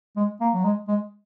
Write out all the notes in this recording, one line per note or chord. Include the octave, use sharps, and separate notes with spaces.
G#3
A#3
F#3
G#3
G#3